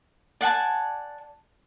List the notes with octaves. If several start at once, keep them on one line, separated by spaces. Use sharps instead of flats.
D5 F#5 G#5 A5